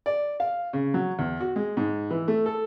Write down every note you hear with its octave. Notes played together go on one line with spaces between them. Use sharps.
D5
F5
C#3
F#3
E2
F#4
G#3
G#2
E3
A3
A4